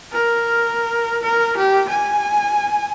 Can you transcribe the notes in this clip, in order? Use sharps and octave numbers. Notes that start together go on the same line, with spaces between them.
A#4
A#4
G4
G#5